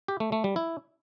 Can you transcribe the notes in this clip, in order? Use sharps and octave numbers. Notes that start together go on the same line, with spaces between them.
G4
A3
A3
G3
E4